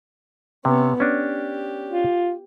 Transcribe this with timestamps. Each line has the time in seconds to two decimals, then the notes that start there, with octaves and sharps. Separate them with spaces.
0.65 C3 B3 C#4
1.00 C#4 D4 G4
1.90 F4